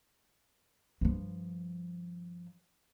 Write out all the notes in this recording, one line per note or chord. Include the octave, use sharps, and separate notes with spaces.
G2 F3